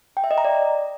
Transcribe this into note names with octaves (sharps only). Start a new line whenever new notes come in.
G5
E5
D#5
A#5
D5